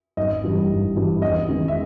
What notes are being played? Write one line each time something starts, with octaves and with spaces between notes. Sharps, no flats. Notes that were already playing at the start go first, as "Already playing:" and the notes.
G#1 D#5
G2 E3 G3
G#1
G2 E3 G3
E2 D#5
D#3 G#3
E5